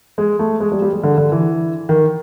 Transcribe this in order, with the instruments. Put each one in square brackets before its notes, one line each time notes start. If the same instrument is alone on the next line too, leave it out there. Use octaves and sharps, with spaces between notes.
[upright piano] G#3
A3
G#3
G3
G3
G#3
D3
D3
E3
D#3